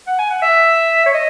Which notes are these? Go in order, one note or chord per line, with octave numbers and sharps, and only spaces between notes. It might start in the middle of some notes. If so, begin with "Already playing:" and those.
F#5
G#5
F#5
E5
C#5
D#5